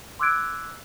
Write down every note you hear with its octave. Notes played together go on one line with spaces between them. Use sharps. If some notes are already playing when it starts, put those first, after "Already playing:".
C6 D6 E6 F#6 G#6 D7